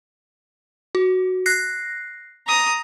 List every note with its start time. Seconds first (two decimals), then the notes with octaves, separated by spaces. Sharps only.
0.95 F#4
1.46 F#6 A#6 C7
2.47 A#5 D#6